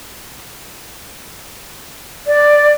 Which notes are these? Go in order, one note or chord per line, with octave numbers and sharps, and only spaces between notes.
D5